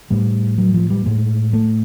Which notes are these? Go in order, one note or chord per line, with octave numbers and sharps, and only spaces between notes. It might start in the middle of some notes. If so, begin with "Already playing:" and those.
A2 G3
F#3
F3
G3
A2 G#3
A3